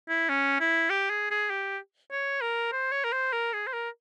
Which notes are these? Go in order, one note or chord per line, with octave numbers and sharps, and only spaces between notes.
E4
C#4
E4
G4
G#4
G#4
G4
C#5
A#4
C5
C#5
A#4
C5
A#4
G#4
C5
A#4